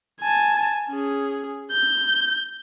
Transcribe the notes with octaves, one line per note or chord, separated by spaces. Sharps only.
G#5 A5
C#4 G#4
G6